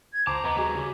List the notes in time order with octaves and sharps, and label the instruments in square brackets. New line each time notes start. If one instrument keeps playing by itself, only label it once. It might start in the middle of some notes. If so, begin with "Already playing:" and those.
[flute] G#6
[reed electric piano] C#2 D6 [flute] C5 [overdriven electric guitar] A5 A#5
[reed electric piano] D#2 A#5 D6 [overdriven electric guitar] B3 [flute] D#5
[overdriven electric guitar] G3 F#4 [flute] G#4
[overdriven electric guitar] C#3